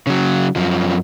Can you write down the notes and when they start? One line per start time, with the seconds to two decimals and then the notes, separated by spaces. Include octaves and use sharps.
0.07 C#3 F#3
0.56 F#2 F3